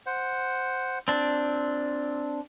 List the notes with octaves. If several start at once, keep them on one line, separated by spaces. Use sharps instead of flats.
C5 F#5
A#2 C4 D4